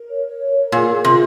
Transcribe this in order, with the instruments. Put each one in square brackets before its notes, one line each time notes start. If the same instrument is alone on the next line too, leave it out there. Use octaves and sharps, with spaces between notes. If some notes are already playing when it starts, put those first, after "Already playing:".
Already playing: [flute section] A#4
C#5
C#5
A#4
A#4
[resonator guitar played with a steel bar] A#2 [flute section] G#4
[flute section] G#4
[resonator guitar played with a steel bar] C3 [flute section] F4